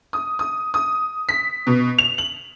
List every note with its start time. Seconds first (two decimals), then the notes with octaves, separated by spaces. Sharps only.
0.13 D#6
0.39 D#6
0.74 D#6
1.29 B6
1.67 B2
1.98 F7
2.18 F#7